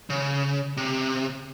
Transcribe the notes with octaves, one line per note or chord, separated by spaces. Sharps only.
C#3
C3